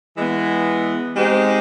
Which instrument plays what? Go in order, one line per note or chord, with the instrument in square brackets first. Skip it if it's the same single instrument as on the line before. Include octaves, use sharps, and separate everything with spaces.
[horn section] E3 G#3 B3
G#3 C4 D#4 G4 C5